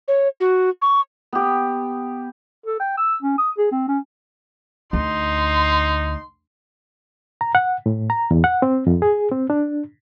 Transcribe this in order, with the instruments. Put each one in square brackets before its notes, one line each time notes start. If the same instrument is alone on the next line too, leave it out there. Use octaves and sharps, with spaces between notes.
[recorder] C#5
F#4
C#6
[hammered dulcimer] B3 G4
[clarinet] A4
G5
E6
C#4
D#6
G#4
C4
C#4
[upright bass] D2 [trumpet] D#4 [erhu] C6
[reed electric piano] A#5
F#5
A2
A#5
E2
F#5
C4
F2
G#4
C4
D4